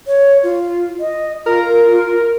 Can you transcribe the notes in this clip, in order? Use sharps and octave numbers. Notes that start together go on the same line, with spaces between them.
C#5
F4
D#5
F4 A#4